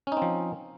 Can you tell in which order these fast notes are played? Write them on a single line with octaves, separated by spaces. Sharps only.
C#4 D#4 C4 F3